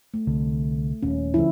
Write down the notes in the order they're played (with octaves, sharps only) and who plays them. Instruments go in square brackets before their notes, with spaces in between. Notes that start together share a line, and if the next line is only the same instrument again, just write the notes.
[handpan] A3
[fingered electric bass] C2 D3
[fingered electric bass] D#1 [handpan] C#4
[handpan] D3 F3 E4